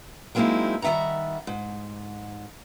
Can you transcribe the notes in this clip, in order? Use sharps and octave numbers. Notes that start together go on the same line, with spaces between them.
F#3 G#3 A#3 C4 D#4 E4
D#3 G3 E5 F#5 A#5
G#2